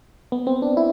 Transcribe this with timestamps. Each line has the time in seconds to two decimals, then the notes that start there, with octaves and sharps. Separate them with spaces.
0.32 B3
0.47 C4
0.62 D4
0.77 E4